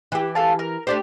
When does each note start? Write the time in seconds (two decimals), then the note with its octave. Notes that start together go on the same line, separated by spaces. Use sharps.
0.12 E3 G4
0.35 A4 F5 A5
0.59 A#4
0.87 A3 D4 G4 C5